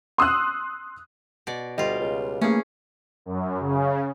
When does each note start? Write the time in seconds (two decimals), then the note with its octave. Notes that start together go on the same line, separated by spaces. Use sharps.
0.18 C6 D#6 E6 F#6
1.47 B2 D5
1.78 D2 G3 F4 D#5
2.00 C#2
2.41 E3 A3 A#3 C#4 G#4
3.26 F#2
3.60 C#3